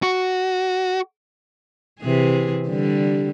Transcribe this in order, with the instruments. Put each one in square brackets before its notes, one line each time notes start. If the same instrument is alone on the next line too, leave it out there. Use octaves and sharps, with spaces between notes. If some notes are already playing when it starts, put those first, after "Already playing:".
[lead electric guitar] F#4
[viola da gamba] C3 E3 G#4
D3 G3